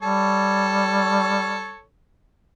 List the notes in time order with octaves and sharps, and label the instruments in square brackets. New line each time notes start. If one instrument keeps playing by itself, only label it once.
[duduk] G3 [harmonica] A4 C#5